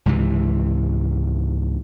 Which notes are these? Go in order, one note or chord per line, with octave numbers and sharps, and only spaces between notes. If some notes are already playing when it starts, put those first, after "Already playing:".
C#2 G#2 C3 E3